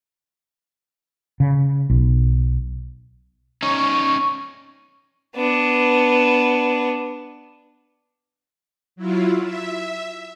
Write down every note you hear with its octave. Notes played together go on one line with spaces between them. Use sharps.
C#3
B1
C#4 D#4 C#6
B3 D4
F#3 E4 F4
E5